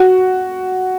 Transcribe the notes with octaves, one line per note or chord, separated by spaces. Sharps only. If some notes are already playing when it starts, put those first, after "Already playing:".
Already playing: F#4